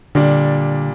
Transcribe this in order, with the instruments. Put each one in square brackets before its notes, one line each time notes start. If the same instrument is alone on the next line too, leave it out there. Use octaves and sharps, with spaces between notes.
[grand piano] A#2 G3 D4 [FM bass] D3